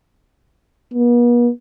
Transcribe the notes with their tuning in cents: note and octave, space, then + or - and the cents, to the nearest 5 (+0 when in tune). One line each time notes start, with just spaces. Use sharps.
B3 -45